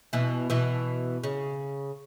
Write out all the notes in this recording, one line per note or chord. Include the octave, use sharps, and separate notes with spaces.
B2 E3
B2 E3
C#3